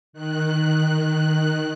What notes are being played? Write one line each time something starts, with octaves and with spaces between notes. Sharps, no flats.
D#3 F#6